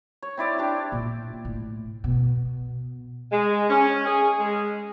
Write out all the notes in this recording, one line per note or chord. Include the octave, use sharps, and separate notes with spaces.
C#5
C4 E4 D5
D4 G4 G5
A#2
A2
B2
G#3
C#4
G#4
G#3